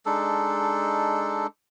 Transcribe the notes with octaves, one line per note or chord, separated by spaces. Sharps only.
G#3 D4 D#4 A4